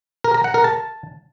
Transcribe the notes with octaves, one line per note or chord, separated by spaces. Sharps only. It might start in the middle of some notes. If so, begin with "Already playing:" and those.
A#4
A#5
F#5
A#4
A5